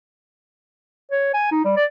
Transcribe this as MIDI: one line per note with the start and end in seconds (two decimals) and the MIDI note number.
1.11 1.33 73
1.34 1.47 80
1.51 1.64 63
1.65 1.73 55
1.76 1.84 74